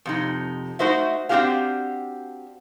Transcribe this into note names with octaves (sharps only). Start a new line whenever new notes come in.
F2 C3 D#4
A3 D#4 F#4 C5 D#5 E5
C4 D4 D#4 F#4 G4 F5